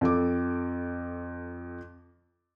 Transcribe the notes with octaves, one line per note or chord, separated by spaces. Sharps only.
F2 A4 D6